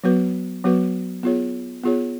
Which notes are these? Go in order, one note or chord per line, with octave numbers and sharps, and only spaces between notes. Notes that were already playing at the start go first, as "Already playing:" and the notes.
F#3 B3 F#4 B4
F#3 B3 F#4 B4
B3 F4 G#4 C#5
B3 F4 G#4 C#5